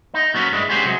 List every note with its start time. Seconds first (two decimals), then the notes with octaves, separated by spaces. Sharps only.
0.14 D#4
0.34 A#2 F#3 B3 C#4
0.52 G2 G#3 E4
0.69 G#3 B3 C#4 G4 B4 C5
0.85 C3 F#3 G#3